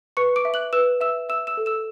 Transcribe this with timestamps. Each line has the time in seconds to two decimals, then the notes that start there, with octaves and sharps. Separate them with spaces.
0.17 B4 C#6 C#7
0.36 D6 D7
0.45 E5
0.54 F#6 F#7
0.73 B4 E6 E7
1.01 E5 E6 E7
1.29 E5 E6 E7
1.47 E6 E7
1.57 A4
1.66 E6 E7